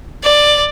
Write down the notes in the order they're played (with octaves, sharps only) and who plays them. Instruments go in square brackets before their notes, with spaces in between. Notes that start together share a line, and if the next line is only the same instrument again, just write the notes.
[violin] D5